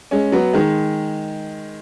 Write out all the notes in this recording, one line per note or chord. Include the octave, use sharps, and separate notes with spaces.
G#3 C#4
F#3 B3
D#3 G#3